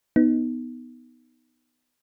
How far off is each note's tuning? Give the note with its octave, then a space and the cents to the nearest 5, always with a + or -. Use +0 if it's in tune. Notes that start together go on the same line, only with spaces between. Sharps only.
B3 +0 D#4 +0